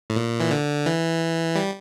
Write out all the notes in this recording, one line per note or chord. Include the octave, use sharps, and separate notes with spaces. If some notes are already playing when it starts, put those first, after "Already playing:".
A2
A#2
E3
D3
E3
G3